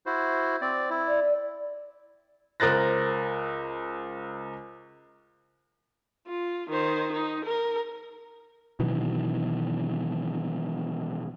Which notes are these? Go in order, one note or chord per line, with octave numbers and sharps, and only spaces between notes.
E4 F#4 C5
C4 D5
E4
D5
C#2 A#4 C5 F#6 A6 A#6
F4
D#3 C5
D#4
A#4
B2 D#3 E3 F#3